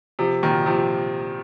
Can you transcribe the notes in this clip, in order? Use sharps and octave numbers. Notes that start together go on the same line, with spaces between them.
C3 F3
A#2 D#3
C3 F3